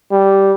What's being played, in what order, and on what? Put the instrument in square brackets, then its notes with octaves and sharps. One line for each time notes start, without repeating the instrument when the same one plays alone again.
[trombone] G3